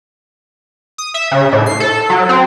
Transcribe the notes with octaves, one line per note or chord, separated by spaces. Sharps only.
D#6
E5
C#3
A2
C7
A4
F#3
C4